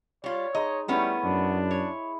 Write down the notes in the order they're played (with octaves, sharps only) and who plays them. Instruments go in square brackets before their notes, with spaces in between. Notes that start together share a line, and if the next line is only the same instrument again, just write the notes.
[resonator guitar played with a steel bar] G3 F4 [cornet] C#5
[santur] G#3 D#4 [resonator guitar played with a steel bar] D#5
[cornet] G3 [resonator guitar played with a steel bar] A3 B3 C#4 [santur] E4 G#4
[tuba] F#2 [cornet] D4
[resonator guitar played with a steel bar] C#5